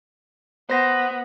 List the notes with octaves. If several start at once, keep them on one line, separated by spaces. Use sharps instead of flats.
B3 C5 A#6